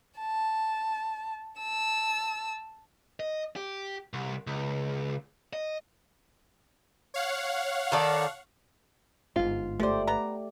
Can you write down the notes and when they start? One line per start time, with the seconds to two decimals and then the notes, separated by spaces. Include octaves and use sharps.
0.19 A5
1.61 A5 E6
3.20 D#5
3.56 G4
4.14 C2
4.47 C#2
5.53 D#5
7.14 C#5 F5 F#5
7.92 D#3 A4 D5
9.36 G1 G#2 F4
9.80 F3 A3 G4 C5 D5
10.07 B3 A#5